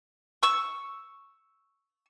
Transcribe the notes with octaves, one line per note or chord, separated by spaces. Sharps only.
C#6 E6